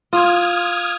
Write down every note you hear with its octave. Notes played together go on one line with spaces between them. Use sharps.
F4 D#6 F6 G#6